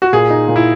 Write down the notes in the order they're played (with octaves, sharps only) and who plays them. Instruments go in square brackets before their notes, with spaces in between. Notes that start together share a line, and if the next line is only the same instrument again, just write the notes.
[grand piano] F#4
[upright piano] A#2 [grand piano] G#4
[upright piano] D#4
A#2
[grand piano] E4